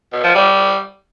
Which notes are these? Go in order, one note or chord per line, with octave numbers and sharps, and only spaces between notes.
B2
F3
G3